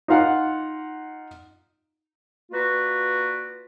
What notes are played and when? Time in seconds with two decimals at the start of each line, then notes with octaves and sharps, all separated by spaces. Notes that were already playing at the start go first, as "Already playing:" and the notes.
0.08 D#4 F4 F5 F#5
2.51 A#3 F4 F#4 B4 D5